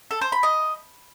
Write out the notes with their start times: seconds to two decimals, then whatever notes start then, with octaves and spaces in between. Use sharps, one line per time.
0.11 A4
0.21 C5
0.32 B5
0.43 D#5